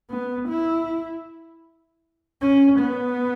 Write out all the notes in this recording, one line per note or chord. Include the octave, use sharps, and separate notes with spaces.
B3
E4
C#4
B3